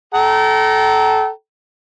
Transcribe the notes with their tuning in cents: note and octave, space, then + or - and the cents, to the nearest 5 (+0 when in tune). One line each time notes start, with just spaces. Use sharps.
A4 -15 G5 -40 A#5 +0